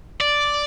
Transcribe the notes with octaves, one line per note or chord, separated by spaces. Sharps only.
D5